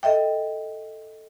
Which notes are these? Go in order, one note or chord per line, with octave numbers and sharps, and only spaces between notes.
A4 D#5 E5 G5